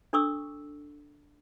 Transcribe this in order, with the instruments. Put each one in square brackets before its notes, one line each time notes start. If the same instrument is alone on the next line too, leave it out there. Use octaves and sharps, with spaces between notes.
[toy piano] D4 A4 C#6 D6 E6